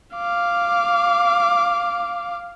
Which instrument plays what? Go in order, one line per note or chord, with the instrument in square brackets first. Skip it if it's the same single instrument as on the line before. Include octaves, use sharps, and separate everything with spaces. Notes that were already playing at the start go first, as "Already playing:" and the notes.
[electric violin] F5 D6